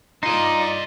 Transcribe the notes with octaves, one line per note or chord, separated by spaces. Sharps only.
D#4 F4 C5 D5 D#5